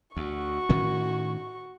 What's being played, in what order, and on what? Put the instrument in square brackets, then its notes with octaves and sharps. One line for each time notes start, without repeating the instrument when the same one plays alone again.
[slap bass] D2 [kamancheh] F#4 C#6
[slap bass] A2 D#3 C#4